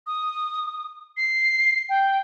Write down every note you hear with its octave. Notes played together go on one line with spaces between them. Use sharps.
D#6
C7
G5